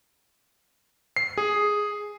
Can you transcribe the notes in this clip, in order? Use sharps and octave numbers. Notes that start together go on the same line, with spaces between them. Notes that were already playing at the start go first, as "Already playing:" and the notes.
C7
G#4